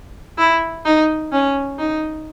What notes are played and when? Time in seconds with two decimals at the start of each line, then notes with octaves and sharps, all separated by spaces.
0.38 E4
0.85 D#4
1.32 C#4
1.79 D#4